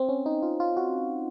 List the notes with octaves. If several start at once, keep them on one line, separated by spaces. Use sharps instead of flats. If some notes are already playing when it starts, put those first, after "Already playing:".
Already playing: C4
C#4
D#4
F4
F4
F#4